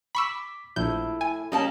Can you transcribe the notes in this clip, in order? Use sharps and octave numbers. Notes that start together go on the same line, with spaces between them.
B5 C#6 D6 E6 B6
A#1 E4 A4 G6
G#5
G3 A#3 C#4 D#5 A5 A#5